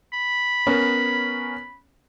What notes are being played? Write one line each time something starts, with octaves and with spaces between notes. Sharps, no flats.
B5
B3 C#4 A#4